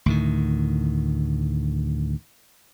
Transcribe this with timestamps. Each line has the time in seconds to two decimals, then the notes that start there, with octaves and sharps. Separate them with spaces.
0.06 D2 A2 D#3